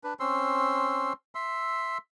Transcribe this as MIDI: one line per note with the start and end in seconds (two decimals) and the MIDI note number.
0.04 0.14 62
0.04 0.14 71
0.20 1.13 60
0.20 1.13 61
0.20 1.13 84
0.20 1.13 88
1.35 1.98 76
1.35 1.98 84
1.35 1.98 88